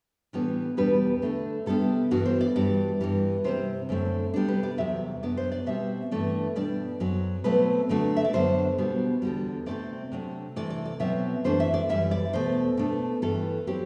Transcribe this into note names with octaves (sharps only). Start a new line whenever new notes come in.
A2 E3 G3 B3 D4
E2 B2 G3 B3 D4 B4
D3 A3 D4
C3 G3 B3 D4 A4
G2 E3 B3 D4 F#4
C5
D5
G2 E3 G3 D5
G2 E3 G3
C3 G3 C4 C5
F#2 D3 A3 C4
C3 G3 B3 D4
B4
D5
E2 C3 F#3 E5
F#2 F#3 B3 D4 D5
C5
D5
B2 G3 C4 E5
G2 E3 A3 D4
B2 G3 D4 D5
F#2 F#3 C4
B2 F#3 A3 C4 B4
D3 F#3 A3 D4
E5
D5
F#2 D3 F#3 B3 D4 C5
B2 G3 B3 D4
E2 D3 G3 F#4
C3 E3 A3 C4 D5
C3 F#3 A3 D4
C3 E3 A3 D5
D5
D5
B2 F#3 C4 E5
F#2 E3 A3 D4 C5
E5
D5
F#2 E3 G3 E5
D5
E2 B2 A3 C5
B2 A3 D4
G2 E3 A3 A4
F#3 C4 G4